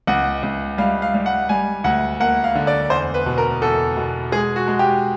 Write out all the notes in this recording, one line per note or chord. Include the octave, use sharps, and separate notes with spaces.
C#2 F#5
C#2
G3 F5
F5
G3
F#5
G3 G#5
D2 F#5
A#3 F#5
F5
D3
D5
E2 C5
B4
B2
A#4
E2 A4
B2
G#3 G#4
F#4
G#3
G4